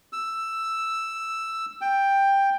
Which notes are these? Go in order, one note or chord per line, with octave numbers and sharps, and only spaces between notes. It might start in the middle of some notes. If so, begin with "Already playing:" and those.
E6
G5